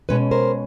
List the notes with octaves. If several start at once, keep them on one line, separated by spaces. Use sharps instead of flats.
B2 G#3 C#4 B4 C#5
A#4 C5